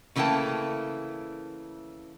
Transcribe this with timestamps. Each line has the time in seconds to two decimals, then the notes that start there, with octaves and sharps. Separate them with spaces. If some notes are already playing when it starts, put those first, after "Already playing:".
0.16 C#3 E3 A3 A#3 G5 A5